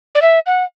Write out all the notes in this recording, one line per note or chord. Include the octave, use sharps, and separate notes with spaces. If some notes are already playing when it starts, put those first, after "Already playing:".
D5
E5
F#5